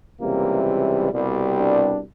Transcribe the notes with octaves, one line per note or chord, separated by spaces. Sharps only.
C#2 C3 E3 G3 A#3
C2 B2 G3
D4